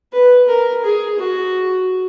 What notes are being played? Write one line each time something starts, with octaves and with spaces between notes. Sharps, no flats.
B4
A#4
G#4
F#4